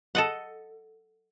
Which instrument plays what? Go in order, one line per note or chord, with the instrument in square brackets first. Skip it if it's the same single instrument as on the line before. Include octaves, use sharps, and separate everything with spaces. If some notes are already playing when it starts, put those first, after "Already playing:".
[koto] A4 D#5 F#5